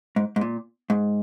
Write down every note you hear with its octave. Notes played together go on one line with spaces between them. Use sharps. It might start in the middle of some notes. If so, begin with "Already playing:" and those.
G#2
G#2
A#2
G#2